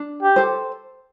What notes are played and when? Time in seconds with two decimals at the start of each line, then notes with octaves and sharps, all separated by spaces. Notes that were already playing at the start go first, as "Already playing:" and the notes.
Already playing: D4
0.22 G4
0.36 A4 C5